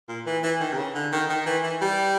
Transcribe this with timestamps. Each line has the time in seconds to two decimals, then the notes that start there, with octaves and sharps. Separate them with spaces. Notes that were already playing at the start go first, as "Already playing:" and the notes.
0.09 A#2
0.27 E3
0.44 E3
0.61 D#3
0.73 C3
0.78 C#3
0.95 D3
1.13 D#3
1.30 D#3
1.46 E3
1.63 E3
1.82 G3